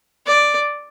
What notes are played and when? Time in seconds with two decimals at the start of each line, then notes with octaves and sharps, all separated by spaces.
0.27 D5